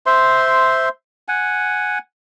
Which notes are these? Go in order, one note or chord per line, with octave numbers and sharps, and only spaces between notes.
C5 E5 C6
F#5 G#5